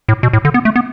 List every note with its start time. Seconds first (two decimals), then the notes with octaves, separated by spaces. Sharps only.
0.09 A2
0.23 B2
0.33 A2
0.45 D3
0.54 B3
0.65 A3
0.76 B3